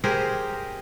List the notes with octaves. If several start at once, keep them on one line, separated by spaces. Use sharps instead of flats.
G4 G#4 A#4 C5